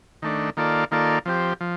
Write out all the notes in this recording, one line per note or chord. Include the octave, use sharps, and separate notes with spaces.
D#3 A3 D4
D#3 A#3 F4 A4 D5
D#3 A#3 F4 A4 D5
F3 C4 G4
F3